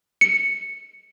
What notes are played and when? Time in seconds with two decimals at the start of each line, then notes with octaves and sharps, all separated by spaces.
0.21 C#7